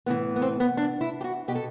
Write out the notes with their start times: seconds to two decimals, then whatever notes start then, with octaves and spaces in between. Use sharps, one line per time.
0.06 A2 E3 B3
0.36 B3
0.42 C4
0.60 B3
0.77 D4
1.01 E4
1.21 G4
1.24 F#4
1.48 B2 G4
1.55 A4